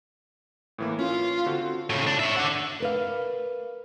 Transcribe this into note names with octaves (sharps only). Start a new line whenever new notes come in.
A2 E3 A#3
C#4 F4
D3 C4 F#4
A2 C#3
D4
C#5 E5
D4 F#5
A#4 B4 F5